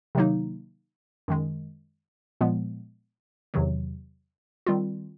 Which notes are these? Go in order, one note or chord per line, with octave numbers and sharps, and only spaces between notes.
C3 D#3 F#3 A#3 D#4
F#2 D#3 G#3
A#2 F3 G#3 B3
E2 C3 D#3 F#3
D#3 G3 C4 F4